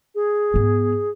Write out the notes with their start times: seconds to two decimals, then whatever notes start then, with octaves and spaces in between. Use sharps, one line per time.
0.15 G#4
0.54 G#2 B3